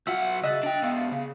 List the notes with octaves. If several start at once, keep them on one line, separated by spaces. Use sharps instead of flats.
B1 F4 F#4 E5 F#5
C#3 D#5 E5 F#6 A6
D4 G5
G#2 B3 F5
C#3